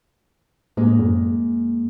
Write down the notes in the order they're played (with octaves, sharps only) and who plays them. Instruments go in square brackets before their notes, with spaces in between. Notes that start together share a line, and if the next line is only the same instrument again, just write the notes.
[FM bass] A2 [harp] G#3 A#3
[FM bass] F#2